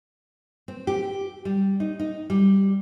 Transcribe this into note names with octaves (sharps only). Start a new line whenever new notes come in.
C4
G4
G3
D#4
D#4
G3